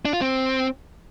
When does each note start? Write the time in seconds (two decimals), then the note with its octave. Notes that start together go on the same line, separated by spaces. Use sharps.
0.05 D4
0.13 F4
0.21 C4